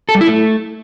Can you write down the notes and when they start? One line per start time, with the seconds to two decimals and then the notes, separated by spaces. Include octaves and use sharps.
0.09 A4
0.15 G3
0.21 E4
0.27 A3